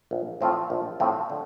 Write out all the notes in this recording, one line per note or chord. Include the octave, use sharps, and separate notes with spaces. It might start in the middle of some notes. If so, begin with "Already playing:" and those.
A#1
A2 F3 C4 F4
A#1
A2 F3 C4 F4
D3